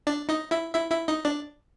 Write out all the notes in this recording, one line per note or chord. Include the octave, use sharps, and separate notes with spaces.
D4 D5
D#4 D#5
E4 E5
E4 E5
E4 E5
D#4 D#5
D4 D5